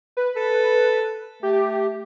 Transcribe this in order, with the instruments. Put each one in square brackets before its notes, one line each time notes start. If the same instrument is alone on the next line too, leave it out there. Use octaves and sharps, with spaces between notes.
[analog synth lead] B4
[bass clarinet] A4
[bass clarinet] A3 [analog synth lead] G4